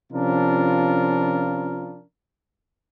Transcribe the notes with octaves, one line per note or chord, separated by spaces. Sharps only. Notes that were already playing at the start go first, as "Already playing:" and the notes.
C3 F3 C#4 D4 F4 A#4